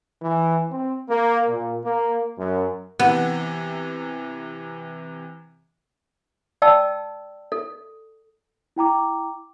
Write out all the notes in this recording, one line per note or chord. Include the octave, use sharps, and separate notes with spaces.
E3
C4
A#3
A#2
A#3
F#2
C3 E3 B3
D5 G5 A5 E6
A4
E4 G5 A#5 D6